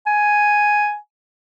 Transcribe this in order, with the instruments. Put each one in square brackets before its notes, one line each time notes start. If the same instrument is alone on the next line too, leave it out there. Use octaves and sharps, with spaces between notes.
[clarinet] G#5